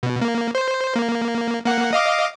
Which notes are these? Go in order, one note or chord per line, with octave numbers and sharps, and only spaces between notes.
B2
A#3
C5
A#3
A#3 F#5
D#5 F5 D6